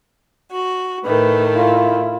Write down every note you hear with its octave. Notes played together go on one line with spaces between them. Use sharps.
F#4
A2 D#3 A3 B4
E4 F4